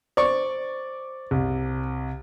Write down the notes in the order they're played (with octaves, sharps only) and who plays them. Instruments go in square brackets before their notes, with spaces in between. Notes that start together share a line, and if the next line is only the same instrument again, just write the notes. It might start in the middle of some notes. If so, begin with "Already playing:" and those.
[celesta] C5 [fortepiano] D5 C#6 [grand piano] D6
[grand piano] C2